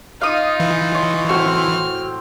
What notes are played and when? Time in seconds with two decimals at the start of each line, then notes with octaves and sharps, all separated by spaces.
0.21 D#4 F4 F5 D#6
0.60 E3
0.95 C#5 C6
1.29 A2 C4 F#4 G5 F6